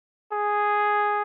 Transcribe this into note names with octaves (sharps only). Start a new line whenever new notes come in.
G#4